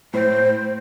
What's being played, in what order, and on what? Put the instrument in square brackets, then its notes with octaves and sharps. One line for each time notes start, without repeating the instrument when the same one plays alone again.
[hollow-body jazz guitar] A2 [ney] C5